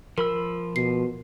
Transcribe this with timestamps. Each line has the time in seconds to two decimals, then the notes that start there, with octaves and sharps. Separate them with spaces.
0.18 F3 A#4 B5 E6
0.76 B2 C7